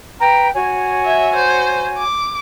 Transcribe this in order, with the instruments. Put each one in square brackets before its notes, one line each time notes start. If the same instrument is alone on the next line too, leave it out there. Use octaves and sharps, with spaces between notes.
[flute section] B4 G5 A#5
F#4 C#5 G#5
[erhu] E5
C5
D6